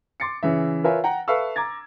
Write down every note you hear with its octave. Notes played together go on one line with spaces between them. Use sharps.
C6 D6 A6 C7 C#7
C#3 E3 E5
F4 A#4 B4 C#5 E5 G#5
F#5 G5 A#5
A4 B4 E5 F5 C#6 E6
A#5 D6 G#6 A6